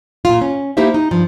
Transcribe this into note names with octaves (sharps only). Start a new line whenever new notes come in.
A#2 F4
C#4
A#3 D#4 E4 G4 C5 E5
D#4
G2 F3